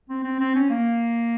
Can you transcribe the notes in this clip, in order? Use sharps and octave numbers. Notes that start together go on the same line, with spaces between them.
C4
C4
C4
C#4
A#3